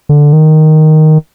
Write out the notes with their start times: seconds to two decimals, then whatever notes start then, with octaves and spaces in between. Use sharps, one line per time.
0.09 D3
0.33 D#3